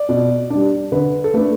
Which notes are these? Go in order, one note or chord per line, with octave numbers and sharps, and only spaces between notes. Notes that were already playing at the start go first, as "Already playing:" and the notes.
Already playing: D5
B2
G3 D4
D3 B4
A4
A3 D4 B4